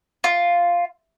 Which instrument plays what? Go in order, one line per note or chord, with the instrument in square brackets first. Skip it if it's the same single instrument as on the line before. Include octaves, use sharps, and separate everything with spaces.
[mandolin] F4